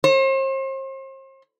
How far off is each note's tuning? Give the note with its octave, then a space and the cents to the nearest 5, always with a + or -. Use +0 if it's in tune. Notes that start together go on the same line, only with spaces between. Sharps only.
C5 +40